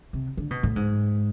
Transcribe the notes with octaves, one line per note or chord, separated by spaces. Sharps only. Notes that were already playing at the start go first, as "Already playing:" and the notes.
C3
D3
B2
A2
G#2